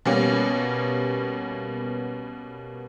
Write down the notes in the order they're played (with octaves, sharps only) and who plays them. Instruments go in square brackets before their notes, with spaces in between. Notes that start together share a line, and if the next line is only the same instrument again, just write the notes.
[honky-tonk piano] B2 G3 A#3 B3 C#4